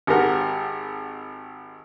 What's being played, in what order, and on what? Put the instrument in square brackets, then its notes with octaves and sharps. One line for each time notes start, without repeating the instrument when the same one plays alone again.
[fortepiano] G#1 G4 A#4 F#5